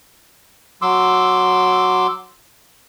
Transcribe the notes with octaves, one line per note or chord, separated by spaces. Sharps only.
F#3 C6 D6 E6